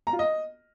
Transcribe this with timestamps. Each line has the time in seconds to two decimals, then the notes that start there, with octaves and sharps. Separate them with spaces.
0.07 A#5
0.13 F4
0.19 D#5